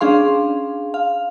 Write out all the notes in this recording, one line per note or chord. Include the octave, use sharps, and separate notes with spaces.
C#4 D4 G#4 F5 C6
F5